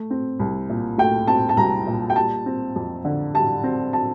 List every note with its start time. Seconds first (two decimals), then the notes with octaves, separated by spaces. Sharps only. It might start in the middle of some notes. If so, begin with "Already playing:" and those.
Already playing: A3
0.10 C4
0.39 C2
0.70 A#2
0.98 A3 G5
1.28 C4 A5
1.49 A5
1.57 C2 A#5
1.87 A#2
2.10 G5
2.16 G3 A5
2.46 C4
2.76 F2
3.05 D3
3.34 G3 A5
3.63 C4
3.93 A5